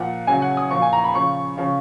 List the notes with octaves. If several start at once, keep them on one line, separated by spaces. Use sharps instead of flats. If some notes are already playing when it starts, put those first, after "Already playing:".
Already playing: A#2 F3 F#5
C#3 F#3 G#5
F#5
D#6
A#2 F3 C#6
G#5
A#5
B5
C#3 F3 C#6
C#3 F3